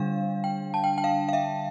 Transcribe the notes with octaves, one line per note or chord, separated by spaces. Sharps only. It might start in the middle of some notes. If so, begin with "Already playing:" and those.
Already playing: D3 G3 D4 F5
G5
A5
G5
G5
F5
F5
E5